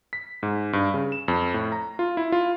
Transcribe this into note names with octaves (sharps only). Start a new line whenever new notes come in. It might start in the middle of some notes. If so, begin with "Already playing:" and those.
B6
G#2
G2
C#3
E7
F2
A2
A#5
F4
E4
F4